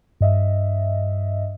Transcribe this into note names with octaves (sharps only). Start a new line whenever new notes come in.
G2 D#5 E5